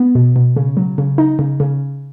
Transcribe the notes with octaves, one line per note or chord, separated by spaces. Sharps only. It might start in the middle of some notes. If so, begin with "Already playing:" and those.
Already playing: B3
B2
B2
C#3
F#3
C#3
D#4
C#3
C#3